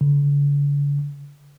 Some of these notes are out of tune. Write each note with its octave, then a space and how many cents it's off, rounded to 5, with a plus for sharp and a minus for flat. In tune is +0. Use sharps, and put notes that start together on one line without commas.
D3 -45